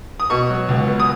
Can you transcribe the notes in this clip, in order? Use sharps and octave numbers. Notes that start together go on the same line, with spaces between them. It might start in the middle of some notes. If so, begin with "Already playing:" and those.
D#6
B2 C#6
F#3
C#2
B3
D#6